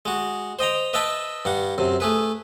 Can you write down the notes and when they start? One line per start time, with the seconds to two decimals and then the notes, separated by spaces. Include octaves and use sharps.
0.05 G#3 F#4
0.59 C5 D#5 G5 A#5
0.93 B4 D#5 E5 G5 A5 B5
1.45 G2 G3 F#5
1.78 F#2 C3
2.00 A3 G#4 B4